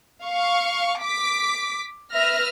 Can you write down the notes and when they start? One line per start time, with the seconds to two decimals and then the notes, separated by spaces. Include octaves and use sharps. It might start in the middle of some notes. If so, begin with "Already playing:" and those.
0.23 F5 C#6
1.03 D6 B6 D7
2.13 B4 E5 F6 A#6